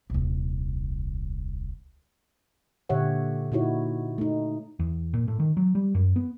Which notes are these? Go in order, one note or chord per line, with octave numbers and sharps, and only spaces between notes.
D#1 C2
A#2 D3 G4 C#5 E5 F#5
A#2 D#4 E4 F#4 C#5
A3 D#4
E2
A#2
A2
D#3
F#3
G3
F#2
B3